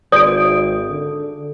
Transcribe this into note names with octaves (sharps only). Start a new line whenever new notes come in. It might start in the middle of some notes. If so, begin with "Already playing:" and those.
G#1 C#5 D5 D#6 D7
D3